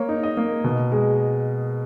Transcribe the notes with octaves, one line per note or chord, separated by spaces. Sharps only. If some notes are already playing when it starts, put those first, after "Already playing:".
Already playing: A#3 C#5
D#4
D#5
A#3
B2
G#3